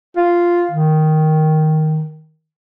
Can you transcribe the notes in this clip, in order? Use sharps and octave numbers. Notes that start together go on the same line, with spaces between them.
F4
D#3